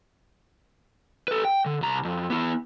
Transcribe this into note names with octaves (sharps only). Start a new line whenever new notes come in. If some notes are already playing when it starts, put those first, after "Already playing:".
A4 B4
G5
D3
C2 A#5
F2
B3 E4